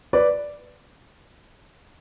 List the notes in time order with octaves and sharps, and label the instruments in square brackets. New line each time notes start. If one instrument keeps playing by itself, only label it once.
[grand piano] B4 D5